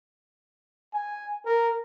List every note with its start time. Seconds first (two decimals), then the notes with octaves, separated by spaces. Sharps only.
0.94 G#5
1.46 A#4